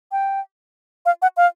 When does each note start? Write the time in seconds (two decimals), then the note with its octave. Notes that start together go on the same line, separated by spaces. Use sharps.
0.12 G5
1.06 F5
1.22 F#5
1.37 F5